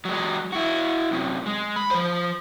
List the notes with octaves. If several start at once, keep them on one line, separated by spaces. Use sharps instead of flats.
F#3 G#3
E4 F#4
F#2 C3
G#3
B5
F3 C5